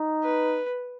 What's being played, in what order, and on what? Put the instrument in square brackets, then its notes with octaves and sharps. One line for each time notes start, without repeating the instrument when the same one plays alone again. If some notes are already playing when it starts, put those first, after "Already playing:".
Already playing: [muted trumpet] D#4
[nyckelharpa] B4